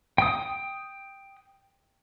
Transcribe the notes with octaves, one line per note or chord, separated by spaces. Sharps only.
G5 D#6